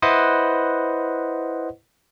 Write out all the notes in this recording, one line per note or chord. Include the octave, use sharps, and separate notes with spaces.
E4 B4 C5 D#5 F#5